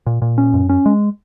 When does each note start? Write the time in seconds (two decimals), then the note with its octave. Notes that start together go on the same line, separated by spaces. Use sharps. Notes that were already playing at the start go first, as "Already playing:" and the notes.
0.06 A#2
0.22 A#2
0.38 C#4
0.54 F#2
0.69 C#4
0.86 G#3